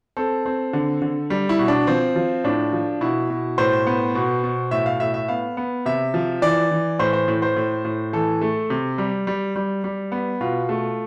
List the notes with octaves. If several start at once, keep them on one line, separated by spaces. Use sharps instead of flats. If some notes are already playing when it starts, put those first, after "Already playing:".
C4 A4
C4
D3
D3
G3
E4
B2
D4
F3 C4
F3
A2 D4
F3
B2 E4
B2
A2 C5
B3
B2
B2
A2 E5
F5
A2 E5
E5
B3 F5
B3
C3 E5
F3
E3 D5
E3
A2 C5
C5
A2
C5
A2
A2
E3 A4
A3
C3
G3
G3
G3
G3
B3
B2 F4
A3